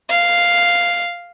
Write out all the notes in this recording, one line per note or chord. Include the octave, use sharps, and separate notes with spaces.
F5